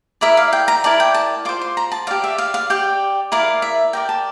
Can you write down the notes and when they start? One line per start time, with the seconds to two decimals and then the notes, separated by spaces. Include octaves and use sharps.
0.21 E4 A#4 D5 E5
0.37 F5
0.53 G5
0.68 A#5
0.84 E4 A#4 D5 A5
1.00 G5
1.14 A5
1.45 F4 C5 D6
1.62 C6
1.77 A#5
1.92 A5
2.07 G4 D5 F5
2.24 E5
2.38 F5
2.54 F5
2.70 G4 D5 G5
3.32 E4 A#4 D5 F5
3.62 E5
3.93 G4 A#4 D5 G5
4.09 A5